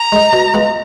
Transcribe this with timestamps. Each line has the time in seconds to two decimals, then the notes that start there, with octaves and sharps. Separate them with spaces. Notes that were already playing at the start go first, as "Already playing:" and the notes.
Already playing: A#5
0.12 G#3 D#4
0.33 B2
0.54 G#3 B3 F4